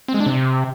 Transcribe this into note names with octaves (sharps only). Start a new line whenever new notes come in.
C4
G#3
D4
C3